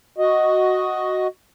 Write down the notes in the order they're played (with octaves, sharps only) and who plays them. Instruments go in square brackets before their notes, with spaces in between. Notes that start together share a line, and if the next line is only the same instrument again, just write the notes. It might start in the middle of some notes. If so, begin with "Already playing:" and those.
[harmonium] F#4 D#5